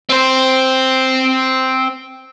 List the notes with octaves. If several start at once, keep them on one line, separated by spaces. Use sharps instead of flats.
C4 C5